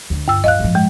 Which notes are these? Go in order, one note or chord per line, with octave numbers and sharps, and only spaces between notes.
D2
G2 E6
D1 D#5 F5 F#6
A2 F3
G#3